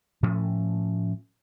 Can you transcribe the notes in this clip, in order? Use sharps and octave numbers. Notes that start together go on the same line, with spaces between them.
A2 F3 A3 C#4